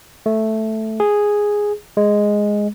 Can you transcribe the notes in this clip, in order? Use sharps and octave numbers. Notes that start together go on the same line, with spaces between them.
A3
G#4
G#3